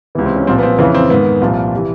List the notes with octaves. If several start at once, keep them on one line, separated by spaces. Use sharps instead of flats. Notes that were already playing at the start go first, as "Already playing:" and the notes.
C#2 C3 E3 B3
C4
C#4
C2 A#2 F3 C4
B3
C4
F2 C#3 E3 B3
C4
G#2 D#3 B3
C2 A#2 F3
C3 E3